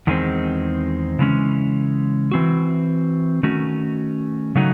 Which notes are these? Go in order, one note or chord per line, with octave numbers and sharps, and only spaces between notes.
E2 D#3 G#3 C4
C#3 E3 G#3 C#4
E3 C4 F#4
D#3 A3 C#4 F#4
C#3 F#3 A3 D#4 F#4